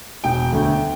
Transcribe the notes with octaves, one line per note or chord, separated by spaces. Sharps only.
E1 G5
D2 D3